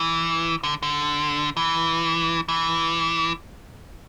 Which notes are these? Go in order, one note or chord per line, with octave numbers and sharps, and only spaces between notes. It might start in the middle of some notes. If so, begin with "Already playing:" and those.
Already playing: E3
D3
D3
E3
E3